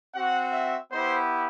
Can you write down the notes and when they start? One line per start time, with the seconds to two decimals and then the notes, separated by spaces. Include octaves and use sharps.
0.14 C4 F#4 F#5
0.53 E5
0.91 B3 E4 G4 C5